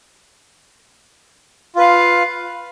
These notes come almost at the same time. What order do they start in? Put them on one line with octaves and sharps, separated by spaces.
F4 B4 F5